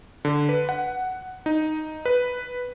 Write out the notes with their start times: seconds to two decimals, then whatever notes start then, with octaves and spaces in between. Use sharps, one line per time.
0.25 D3
0.49 B4
0.69 F#5
1.46 D#4
2.05 B4